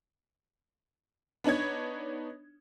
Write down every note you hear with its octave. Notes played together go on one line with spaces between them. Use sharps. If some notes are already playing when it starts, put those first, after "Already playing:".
B3 D4 D#4 C#5 G#6